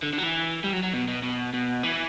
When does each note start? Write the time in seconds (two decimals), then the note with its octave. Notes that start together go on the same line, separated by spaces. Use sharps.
0.03 D3
0.13 D3
0.18 F#3
0.23 E3
0.64 G3
0.73 F#3
0.83 F#3
0.94 B2
1.08 B2
1.23 B2
1.53 B2
1.83 E3